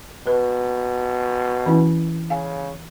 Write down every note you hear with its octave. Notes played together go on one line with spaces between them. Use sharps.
B2 B4
E3 C#4 E4
C#3 F5 G#5